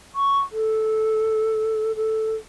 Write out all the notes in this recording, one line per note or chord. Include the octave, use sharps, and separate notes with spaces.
C#6
A4
A4